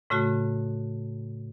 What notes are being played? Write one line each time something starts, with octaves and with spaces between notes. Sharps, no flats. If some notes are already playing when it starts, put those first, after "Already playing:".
A2 C#3 A3 F#4